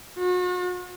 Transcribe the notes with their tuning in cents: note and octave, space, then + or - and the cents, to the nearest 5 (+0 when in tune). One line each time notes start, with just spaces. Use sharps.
F#4 -40